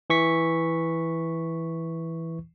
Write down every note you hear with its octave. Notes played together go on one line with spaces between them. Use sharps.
E3 C#6 B6